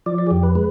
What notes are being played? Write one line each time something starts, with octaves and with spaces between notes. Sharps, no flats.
F3 D5
D5
G#4
F2 G4
B4
G#3 B4